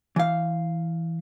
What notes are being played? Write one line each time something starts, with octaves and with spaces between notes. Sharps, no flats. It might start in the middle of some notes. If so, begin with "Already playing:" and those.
E3 F5